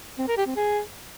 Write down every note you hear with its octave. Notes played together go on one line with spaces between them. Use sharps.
C4
A#4
G4
C4
G#4